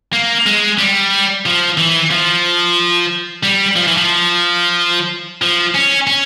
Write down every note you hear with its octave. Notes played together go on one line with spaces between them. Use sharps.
A#3
G#3
G3
F3
E3
F3
G3
F3
E3
F3
F3
C#4
C#4